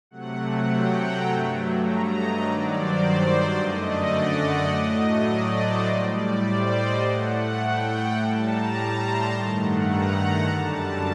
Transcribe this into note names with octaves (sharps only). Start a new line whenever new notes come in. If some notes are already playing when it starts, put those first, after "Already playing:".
C3 F#3 A3 F#5
F#5
G5
A#5
G2 F#3 A3
A#5
D#5
G2 D#3 F#3 D5
C5
F#2 D3 A3 D#5
D5
F#5
F#5
A2 F#3 A3 D#5
D5
C5
A2 G3
D5
C5
D#5
A2 A3 F#5
G5
G5
A2 G3 A5
A#5
C6
G2 D#3 A3
F#5
A#5
A#5
F#2 D3 G3 A5